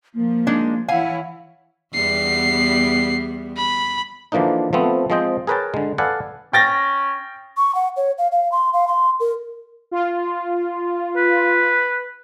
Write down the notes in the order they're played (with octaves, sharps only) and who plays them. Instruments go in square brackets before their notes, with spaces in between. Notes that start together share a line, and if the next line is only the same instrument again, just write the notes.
[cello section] F3 [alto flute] A#3
[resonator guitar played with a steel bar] G#3 D4 D#4
[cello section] E3 E4 C#5 [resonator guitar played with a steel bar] F5 G#5 [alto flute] F#5
[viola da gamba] E2 G3 B3 [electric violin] C7
[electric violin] B5
[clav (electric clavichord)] D3 E3 F3 A#3 D4 D#4
F3 A3 B3 C4
F3 G#3 C4 D#5 G5
G#4 A#4 B4 C#5 G5 A5
D3 G#3
A4 B4 D5 F5 F#5 G#5
[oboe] C#4 [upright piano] G5 A6 A#6
[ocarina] C#6
F#5
C#5
F5
F5
C6
F5
C6
A#4
[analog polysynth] F4
[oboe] B4